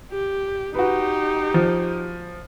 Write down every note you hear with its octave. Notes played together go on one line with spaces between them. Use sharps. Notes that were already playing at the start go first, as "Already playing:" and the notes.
G4
D#4 F#4 G4 B4
F3